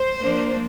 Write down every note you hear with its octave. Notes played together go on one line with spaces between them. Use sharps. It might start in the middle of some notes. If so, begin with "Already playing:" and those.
Already playing: C5
F3 A#3 D4